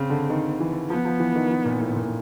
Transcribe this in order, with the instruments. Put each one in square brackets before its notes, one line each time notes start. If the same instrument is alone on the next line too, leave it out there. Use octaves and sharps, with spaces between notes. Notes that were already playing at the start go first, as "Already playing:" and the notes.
Already playing: [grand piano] C#3 [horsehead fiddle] C4
[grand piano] D3
D#3
E3
[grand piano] F3 [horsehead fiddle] B3
[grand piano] F3
E3
D#3
E3
A#2
A2
A#2